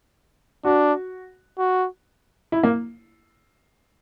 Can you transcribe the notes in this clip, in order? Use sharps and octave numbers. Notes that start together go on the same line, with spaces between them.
D4 F#4
F#4
E4
A#3